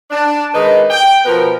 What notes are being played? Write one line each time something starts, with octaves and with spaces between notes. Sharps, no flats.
D4
D#3 G#3 D#4 B4
G5
B2 F3 B3 A#4